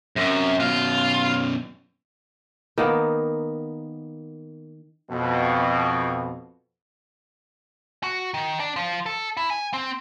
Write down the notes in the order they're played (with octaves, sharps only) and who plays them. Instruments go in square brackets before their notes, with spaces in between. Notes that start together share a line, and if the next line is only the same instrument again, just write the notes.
[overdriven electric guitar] F#2 [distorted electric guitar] C3
[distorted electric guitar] F#2 B2 [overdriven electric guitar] F4
[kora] D#3 A#3 B3
[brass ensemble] F2 B2
[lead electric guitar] F#4
D#3
D4
F3
A4
E4
G#5
C4